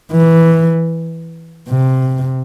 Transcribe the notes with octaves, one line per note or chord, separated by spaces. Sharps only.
E3
C3